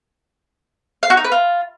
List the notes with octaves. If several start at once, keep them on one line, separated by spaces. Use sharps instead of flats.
F5
F#4
D#4
B4
F4